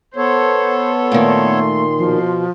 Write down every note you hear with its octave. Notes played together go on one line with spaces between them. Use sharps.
B3 A4 C5 C#5
A#2 D#3 A3 C6
B2 F3